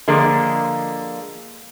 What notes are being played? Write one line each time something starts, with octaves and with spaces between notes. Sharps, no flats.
D3 F3 G#3 A#3